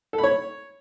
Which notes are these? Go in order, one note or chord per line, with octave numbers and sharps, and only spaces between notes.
A4
B5
C#5